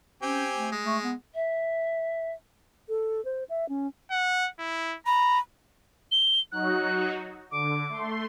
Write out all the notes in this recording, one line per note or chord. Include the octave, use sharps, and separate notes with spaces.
C4 C#4 G4 G#5
A3
G#3
A3
B3
E5
A4
C5
E5
C#4
F#5
E4
A#5 B5
G7
F#3 D#4 F#4 F#6
D3 D6
A3 C6